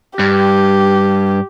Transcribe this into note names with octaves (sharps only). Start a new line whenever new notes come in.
G2 G4